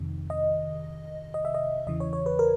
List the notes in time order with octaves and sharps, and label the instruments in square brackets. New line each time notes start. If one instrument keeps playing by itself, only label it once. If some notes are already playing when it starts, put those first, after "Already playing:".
Already playing: [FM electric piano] F2 C3 D#3
D#5
D#5
E5
D#5
E2 C#3 E3 D#5
C#5
C#5
B4
A#4